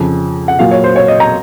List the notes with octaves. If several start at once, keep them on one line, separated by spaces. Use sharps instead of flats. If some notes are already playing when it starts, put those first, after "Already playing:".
Already playing: F2 C#3 F3
F#5
A#2 F#3 F5
C#5
C5
C#5
D#5
A#5